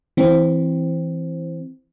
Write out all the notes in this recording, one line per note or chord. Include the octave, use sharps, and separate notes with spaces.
E3 C4